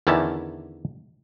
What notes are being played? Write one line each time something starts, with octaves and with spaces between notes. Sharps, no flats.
E2 D3 D#3 C#4 E4 A5